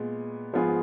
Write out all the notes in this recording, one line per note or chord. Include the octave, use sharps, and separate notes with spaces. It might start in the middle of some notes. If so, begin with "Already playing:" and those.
Already playing: A#2 G#3 B3
G#2 F3 B3 F4 G#4